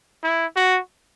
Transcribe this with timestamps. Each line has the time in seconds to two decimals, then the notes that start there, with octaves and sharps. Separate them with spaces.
0.23 E4
0.56 F#4